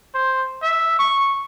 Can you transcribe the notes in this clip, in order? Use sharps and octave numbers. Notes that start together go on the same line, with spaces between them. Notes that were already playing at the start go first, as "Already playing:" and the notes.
C5
E5
C#6